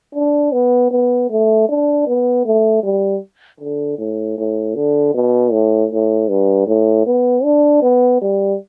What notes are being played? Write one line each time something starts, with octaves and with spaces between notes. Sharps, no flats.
D4
B3
B3
A3
D4
B3
A3
G3
D3
A2
A2
D3
B2
A2
A2
G2
A2
B3
D4
B3
G3